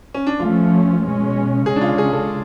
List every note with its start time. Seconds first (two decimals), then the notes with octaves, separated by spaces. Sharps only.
0.14 C#4
0.27 D4
0.40 F3 A3 C#4 F4
1.03 B2 G#3 C#4
1.66 C#3 G#3 C#4 G#4
1.76 D4
1.81 F4
1.98 G#4
2.13 A4